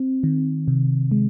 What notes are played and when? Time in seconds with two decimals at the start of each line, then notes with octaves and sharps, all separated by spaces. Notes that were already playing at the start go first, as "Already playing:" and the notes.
Already playing: C4
0.24 D#3
0.68 C3
1.11 G#3